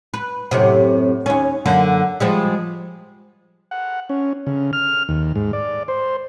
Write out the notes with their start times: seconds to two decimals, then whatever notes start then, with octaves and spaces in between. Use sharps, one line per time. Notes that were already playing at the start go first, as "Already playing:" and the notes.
0.14 B4
0.51 F#2 A2 C3
1.26 D#2 C#4
1.66 F#2 D3 A#3
2.20 F3 G3 G#3
3.71 F#5
4.09 C#4
4.47 C#3
4.73 F6
5.09 D#2
5.36 G#2
5.53 D5
5.88 C5